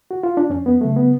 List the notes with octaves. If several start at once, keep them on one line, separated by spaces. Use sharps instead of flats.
F#4
F4
D4
F2 C#4
B3
C#3 F#3 A3
B3